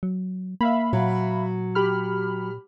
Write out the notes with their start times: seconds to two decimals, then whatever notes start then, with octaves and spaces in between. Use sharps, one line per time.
0.03 F#3
0.61 A#3 E5 F5 B5
0.93 A#2 F#3
1.75 G4 B5 F6